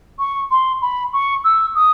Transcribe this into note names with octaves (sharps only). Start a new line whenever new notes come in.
C#6
C6
B5
C#6
E6
D#6